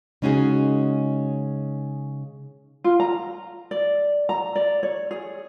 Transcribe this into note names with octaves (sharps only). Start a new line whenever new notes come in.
C#3 G#3 C#4 D#4 F#4 G#4
F4
A#5
D5
A#5
D5
C#5
G#4